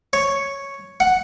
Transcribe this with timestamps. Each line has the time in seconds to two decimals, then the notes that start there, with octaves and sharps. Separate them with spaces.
0.13 C#5
1.00 F#5